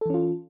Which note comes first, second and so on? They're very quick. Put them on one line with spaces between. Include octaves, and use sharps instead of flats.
A4 E3 C#4 F4